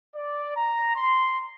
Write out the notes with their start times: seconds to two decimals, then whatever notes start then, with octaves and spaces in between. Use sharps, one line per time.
0.14 D5
0.56 A#5
0.95 C6